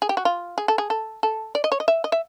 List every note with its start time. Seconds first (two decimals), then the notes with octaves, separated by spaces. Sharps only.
0.02 G#4
0.09 G4
0.17 F#4
0.25 F4
0.58 G#4
0.68 A4
0.78 G#4
0.90 A4
1.23 A4
1.55 D5
1.64 D#5
1.72 C#5
1.80 D#5
1.88 E5
2.04 D#5
2.12 E5